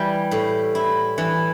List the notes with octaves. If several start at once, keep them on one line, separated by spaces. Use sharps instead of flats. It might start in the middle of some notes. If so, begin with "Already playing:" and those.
Already playing: E3 G3
A2
E4
E3